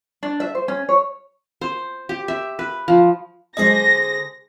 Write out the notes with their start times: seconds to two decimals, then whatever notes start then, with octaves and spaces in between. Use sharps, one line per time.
0.23 D4
0.40 E5
0.55 C5
0.68 C#4
0.89 C#5
1.61 C5
2.09 G4
2.28 E5
2.59 B4
2.88 F3
3.57 D3 F#3 G#3 G#4 C5 D#5 A#6